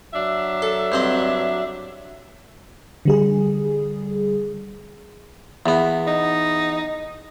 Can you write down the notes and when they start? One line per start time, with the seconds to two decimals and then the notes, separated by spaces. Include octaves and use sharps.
0.14 F#3 D4 E5
0.62 A4
0.92 G2 C4 D#5
3.05 D3 G3 G#4
5.66 E2 B3
6.07 D#4